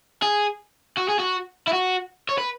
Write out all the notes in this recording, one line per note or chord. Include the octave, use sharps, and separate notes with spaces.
G#4
F#4
G#4
F#4
E4
F#4
C#5
B4